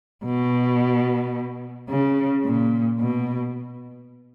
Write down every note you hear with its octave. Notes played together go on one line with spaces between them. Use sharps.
B2
C#3
A#2
B2